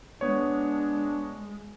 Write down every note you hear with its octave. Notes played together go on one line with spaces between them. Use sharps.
G#3 B3 D4 C#5